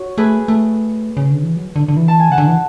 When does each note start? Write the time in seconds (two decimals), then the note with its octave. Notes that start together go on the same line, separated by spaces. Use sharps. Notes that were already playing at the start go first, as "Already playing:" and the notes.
Already playing: F#4 C#5
0.17 A3 G#4 B4
0.48 A3
1.17 C#3
1.31 D3
1.43 E3
1.56 F#3
1.76 D3
1.88 D3
1.97 E3
2.08 A5
2.20 G#5
2.29 C#3 F#5 A5
2.38 D3
2.47 E3